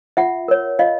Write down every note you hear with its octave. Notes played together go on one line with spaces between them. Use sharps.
F4 E5 F#5
A#4 C#5
F4 D#5 F5